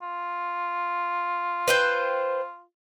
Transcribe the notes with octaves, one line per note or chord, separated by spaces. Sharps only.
F4
B4 C5 G5